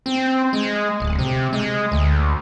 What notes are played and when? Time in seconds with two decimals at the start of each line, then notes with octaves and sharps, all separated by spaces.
0.06 C4
0.53 G#3
1.00 D1
1.19 C3
1.53 G#3
1.91 D2